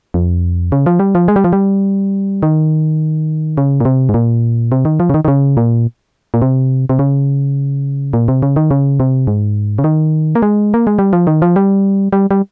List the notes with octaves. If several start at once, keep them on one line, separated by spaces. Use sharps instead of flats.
F2
C#3
F3
G3
F3
G#3
G3
F3
G3
D#3
C#3
A#2
C3
G#2
A#2
C3
D#3
F3
C#3
D#3
D#3
C#3
A#2
A#2
C3
C3
C#3
A#2
C3
C#3
D#3
C#3
C3
G#2
C#3
D#3
A#3
G#3
A#3
G#3
G3
F3
D#3
F3
G3
G3
G3